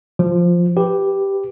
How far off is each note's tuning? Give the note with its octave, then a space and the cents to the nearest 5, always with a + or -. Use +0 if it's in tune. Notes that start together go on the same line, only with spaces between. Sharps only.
F3 +0 F4 +0
G4 +0 B4 +0